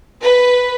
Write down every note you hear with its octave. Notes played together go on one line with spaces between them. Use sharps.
B4